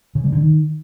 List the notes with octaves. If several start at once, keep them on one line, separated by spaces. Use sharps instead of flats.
C#3
G3
D3
D#3